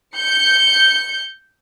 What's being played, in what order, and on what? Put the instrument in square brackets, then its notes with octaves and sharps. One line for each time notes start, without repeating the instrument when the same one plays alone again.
[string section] G6 C#7